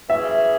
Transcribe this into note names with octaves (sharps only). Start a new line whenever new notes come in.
E3 C#4 G#4 E5